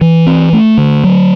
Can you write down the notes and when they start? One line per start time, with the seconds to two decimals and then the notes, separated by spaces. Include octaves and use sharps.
0.01 E3
0.27 C4
0.53 A3
0.77 D3
1.04 F#3